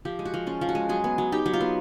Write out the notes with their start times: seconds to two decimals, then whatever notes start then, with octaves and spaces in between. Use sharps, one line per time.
0.05 F3 G4
0.19 G#3
0.25 F#4
0.34 F3
0.47 C#4 F4
0.61 F3
0.69 F#4
0.75 G#3
0.89 F#3 G#4
1.04 B3
1.18 F#3
1.32 D#4 G4
1.46 F#3
1.53 F4
1.61 B3